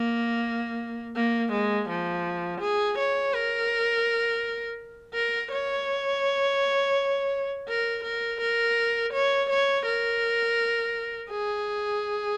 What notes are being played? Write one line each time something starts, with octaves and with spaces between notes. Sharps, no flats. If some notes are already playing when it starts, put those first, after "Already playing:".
Already playing: A#3
A#3
G#3
F3
G#4
C#5
A#4
A#4
C#5
A#4
A#4
A#4
C#5
C#5
A#4
G#4